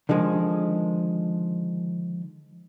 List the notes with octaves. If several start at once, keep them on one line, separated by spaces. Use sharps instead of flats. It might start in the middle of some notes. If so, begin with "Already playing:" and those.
D3 D#3 F3 G#3